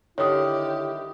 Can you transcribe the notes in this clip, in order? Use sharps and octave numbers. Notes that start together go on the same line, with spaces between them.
D3 D#3 E4 G4 C#5 D#6